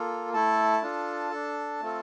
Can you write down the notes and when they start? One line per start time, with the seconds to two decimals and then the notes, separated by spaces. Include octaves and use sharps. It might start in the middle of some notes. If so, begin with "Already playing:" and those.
Already playing: A#3 F4 A4
0.33 A3 E4 A4 A5
0.82 D4 F4 A4
1.31 D4 A4
1.80 A3 C4 F4 A4